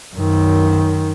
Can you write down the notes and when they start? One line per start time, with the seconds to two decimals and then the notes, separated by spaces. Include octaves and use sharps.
0.16 F#2 D#3